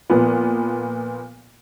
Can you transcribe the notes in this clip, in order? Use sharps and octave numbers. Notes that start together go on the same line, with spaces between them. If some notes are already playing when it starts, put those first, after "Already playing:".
A#2 F3 B3